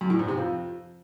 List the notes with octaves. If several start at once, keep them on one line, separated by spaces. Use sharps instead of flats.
F#2
A2
G#2
C3
F2